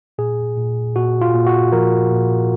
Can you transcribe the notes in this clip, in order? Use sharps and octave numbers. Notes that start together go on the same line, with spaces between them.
A#2 G#4
A#2
A#2 F#4
F4
A#2
F#4
F3 A#4
A#2